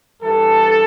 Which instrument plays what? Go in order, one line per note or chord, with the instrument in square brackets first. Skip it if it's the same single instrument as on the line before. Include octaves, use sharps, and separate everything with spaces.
[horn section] G2 E3 A4